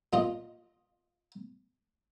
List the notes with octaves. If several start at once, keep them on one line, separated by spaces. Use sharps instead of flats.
A#2 F4 D#5